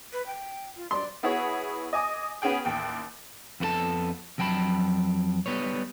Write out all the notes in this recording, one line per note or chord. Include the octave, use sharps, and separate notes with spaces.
B4
G5
F4
D5 C6
B3 E4 F#4 G#4 C#5
D#5 G#5 D6 D#6
B3 C#4 F#4 G#4 G5
A1 D#2 G5
F2 B3 F#4 A4 A5
F2 F#3 G5 A5 B5
G3 B3 B4 C#5